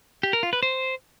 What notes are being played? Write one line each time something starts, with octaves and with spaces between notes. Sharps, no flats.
G4
A#4
F4
B4
C5